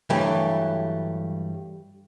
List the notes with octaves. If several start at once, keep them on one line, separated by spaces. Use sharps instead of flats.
G2 E3 F#3 G3 A3